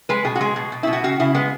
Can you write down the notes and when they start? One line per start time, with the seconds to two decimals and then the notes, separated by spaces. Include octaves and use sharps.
0.09 G#3 B4
0.25 B2 G#4
0.35 F#4
0.41 G#3 G#4
0.56 B2
0.72 B2
0.83 B2 E4
0.93 F#4
1.04 C#3 F#4
1.20 C#3 E4
1.35 G#3 B3